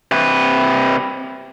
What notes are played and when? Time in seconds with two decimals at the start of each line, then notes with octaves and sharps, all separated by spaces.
0.11 C3 B4